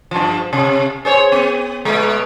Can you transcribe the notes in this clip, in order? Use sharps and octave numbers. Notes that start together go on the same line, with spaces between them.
G2 F3
C3
G#4 C5 C#5
B3
B2 G#3